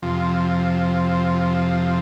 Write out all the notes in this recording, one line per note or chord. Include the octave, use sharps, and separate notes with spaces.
F2 C3 F3